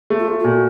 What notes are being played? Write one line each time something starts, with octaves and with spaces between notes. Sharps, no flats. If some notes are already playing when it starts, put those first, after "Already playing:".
A3
F4
A3
F4
A#2 F#4